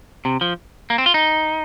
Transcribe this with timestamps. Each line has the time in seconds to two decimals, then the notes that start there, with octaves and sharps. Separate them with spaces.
0.25 C3
0.41 F3
0.90 A#3
0.98 C4
1.06 F4
1.14 D#4